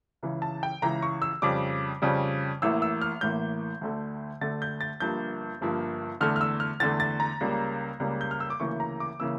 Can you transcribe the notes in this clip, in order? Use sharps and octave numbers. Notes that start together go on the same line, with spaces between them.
C#2 C#3 E3
A5
G5
C#2 C#3 E3 A#5
C#6
E6
F2 C#3 G3 D6
F2 C#3 G3
A1 A2 E3 A#3 E6
E6
F6
A1 A2 E3 A#3 G6
D2 D3 A3
D2 D3 A3 A6
G6
A6
G1 G2 F3 A#3 G6
G1 G2 F3 A#3
E2 D3 A3 F6
F6
E6
F6
E2 D3 A3 A6
A6
A#5
C#2 C#3 G3 A#3
C#2 C#3 G3 A#3
G6
F6
E6
D6
D2 C#3 E3 A#3 C#6
A#5
D6
C#3 E3 A#3 E6